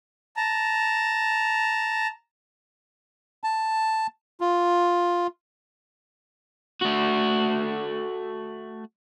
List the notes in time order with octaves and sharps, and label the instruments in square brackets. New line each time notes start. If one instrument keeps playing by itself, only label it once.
[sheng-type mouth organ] A5 A#5
[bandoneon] A5
F4
[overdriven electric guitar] A3 F#4